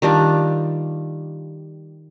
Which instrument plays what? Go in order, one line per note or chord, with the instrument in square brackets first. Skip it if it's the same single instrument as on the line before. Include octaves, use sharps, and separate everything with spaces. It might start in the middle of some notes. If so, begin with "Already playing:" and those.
[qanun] D#3 G3 D4 F4